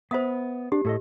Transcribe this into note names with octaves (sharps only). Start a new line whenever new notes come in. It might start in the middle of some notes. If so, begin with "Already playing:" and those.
B3 C5 E5 B5 D#6
D4 G4
A2 A4 D#5